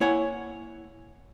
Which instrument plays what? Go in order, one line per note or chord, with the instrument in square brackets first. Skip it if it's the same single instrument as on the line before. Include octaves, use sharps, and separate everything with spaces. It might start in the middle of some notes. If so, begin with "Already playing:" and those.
[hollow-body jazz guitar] A#3 E4 C#5 F#5 G#5